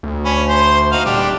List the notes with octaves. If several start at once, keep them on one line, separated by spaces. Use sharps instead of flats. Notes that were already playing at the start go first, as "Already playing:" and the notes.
D2
C#4 B5
C5 C6
D#4 F#4 F5
D#1 G3 D4 G4